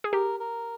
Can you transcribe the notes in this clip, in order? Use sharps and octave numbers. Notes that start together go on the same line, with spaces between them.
G#4
G4 A#4
A#4